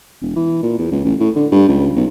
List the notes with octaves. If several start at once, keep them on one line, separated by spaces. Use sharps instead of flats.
E1
E3
A#2
E2
C#2
A1
A2
D3
G2
C#2
B1